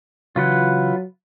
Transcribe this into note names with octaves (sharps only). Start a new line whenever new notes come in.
C#3 E3 F#3 F4 B4 F#5